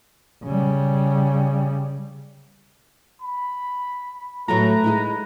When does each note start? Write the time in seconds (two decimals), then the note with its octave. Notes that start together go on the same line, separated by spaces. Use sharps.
0.44 C#3 G3
3.22 B5
4.48 A2 F#3 A3 F#4 B4 A#5
4.84 G#3 D#4 E4